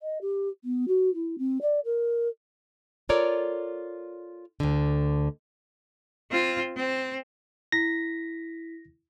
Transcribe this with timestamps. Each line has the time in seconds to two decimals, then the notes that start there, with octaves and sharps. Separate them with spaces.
0.01 D#5
0.21 G4
0.64 B3
0.88 F#4
1.14 E4
1.38 C4
1.61 D5
1.85 A#4
3.09 F4 A4 A#4 C#5 D5
4.60 D2 D3
6.31 C4 F4
6.76 C4
7.72 E4 A#6 B6